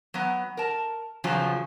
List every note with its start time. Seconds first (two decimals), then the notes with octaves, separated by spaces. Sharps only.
0.14 F#3 B3
0.57 A#4 A5
1.24 E2 C#3 F3 F#3